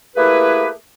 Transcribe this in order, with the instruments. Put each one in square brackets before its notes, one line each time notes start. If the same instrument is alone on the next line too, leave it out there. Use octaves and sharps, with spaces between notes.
[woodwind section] A3 A#3 E4 G4 G#4 B4